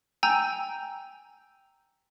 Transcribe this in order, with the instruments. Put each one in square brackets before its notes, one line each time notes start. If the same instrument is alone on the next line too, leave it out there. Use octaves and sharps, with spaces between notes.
[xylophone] G5 G#5 A#5 E6 G6